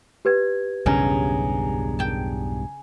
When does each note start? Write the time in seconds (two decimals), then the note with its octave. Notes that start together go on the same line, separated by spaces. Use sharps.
0.25 G4 B4 G#6
0.86 B1 E2 G2 C#3 G#4 A#5
1.99 G5 A5